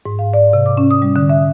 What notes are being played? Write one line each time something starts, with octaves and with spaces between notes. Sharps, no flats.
G#2
F5
D5
C3
D6
C#4
D#6
G3
D3
E5